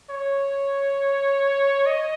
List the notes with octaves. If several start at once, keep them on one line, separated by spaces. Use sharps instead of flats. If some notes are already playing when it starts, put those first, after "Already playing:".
C#5
D#5